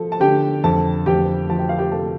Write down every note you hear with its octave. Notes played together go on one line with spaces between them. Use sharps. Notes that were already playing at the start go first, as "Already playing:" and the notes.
Already playing: F3 A4
A5
D3 G4 G5
F2 A4 A5
F2 G4 G5
F3 A5
G5
F5
G4 G5
C3 A4 A5